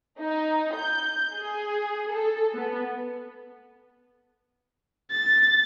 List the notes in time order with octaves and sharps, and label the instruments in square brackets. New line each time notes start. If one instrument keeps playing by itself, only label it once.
[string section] D#4
G6
G#4
A4
B3
[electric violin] A6